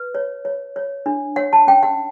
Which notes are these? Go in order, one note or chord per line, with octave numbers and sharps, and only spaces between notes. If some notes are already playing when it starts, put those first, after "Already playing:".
Already playing: B4
C#5
C#5
C#5
D4
C#5 F#5
A5
C#4 G5
F#5